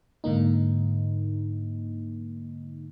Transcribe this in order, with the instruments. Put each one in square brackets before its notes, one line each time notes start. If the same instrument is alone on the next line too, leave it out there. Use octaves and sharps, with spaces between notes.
[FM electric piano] G#2 D3 A#3 D#4